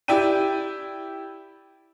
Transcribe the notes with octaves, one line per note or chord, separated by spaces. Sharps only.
E4 G4 D5 G5 D#7